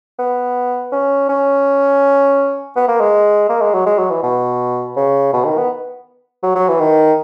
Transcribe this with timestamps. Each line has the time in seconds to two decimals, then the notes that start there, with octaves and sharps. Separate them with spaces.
0.19 B3
0.92 C#4
1.29 C#4
2.76 B3
2.88 A#3
3.00 G#3
3.49 A#3
3.61 G#3
3.74 F#3
3.86 G#3
3.98 F#3
4.10 E3
4.23 B2
4.96 C#3
5.33 B2
5.45 D#3
5.57 B3
6.43 F#3
6.55 F#3
6.68 E3
6.80 D#3